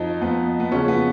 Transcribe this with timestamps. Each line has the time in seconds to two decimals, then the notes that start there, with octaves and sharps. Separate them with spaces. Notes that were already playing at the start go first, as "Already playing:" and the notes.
Already playing: F2 F3 D#4
0.21 F2 F3 B3
0.60 B3
0.72 F2 C#3 F#3 C#4
0.88 B3